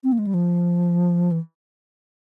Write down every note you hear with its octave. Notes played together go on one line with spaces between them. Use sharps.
C4
A#3
G#3
G3
F3
E3